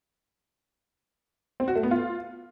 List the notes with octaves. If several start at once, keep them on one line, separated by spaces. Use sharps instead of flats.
C4
F#4
A3
B3
F4